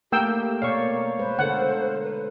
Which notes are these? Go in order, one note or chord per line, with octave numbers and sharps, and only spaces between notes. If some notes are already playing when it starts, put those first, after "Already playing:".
A3 A#3 G4 A#4 G5 E6
B2 A#3 C#5 D5 F5 C#6
G#3 B4 C5
D3 A4 A#4 F#5
B4